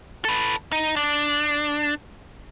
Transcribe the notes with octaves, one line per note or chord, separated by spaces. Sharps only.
A4 B4
D#4
D4